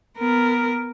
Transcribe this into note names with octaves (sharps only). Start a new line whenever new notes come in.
B3 A#4